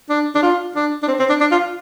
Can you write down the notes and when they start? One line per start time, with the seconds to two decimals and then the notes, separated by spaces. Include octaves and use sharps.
0.09 D4
0.35 D4
0.42 F4
0.76 D4
1.03 D4
1.08 C4
1.19 C4
1.29 D4
1.41 D4
1.51 F4